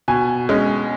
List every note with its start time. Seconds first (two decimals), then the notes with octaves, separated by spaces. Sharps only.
0.08 B2 G#5
0.49 G#3 C#4